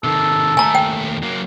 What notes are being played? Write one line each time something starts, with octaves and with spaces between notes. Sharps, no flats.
C3 D#3 A4
D#2 A3 G#5 A#5
G5
F#3 A#3